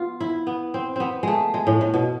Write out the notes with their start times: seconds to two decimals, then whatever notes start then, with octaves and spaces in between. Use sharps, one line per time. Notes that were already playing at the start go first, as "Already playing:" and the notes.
Already playing: B3 F4
0.20 E4
0.47 B3
0.74 C4
0.96 B3 C4
1.23 G#3 A3
1.54 G#3
1.67 A2
1.81 A2
1.94 B2